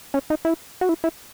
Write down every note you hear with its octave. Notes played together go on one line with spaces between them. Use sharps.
C#4
D#4
E4
F#4
E4
E4